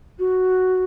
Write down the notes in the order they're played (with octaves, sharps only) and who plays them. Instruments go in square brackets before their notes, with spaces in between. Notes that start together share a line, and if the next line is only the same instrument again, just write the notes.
[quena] F#4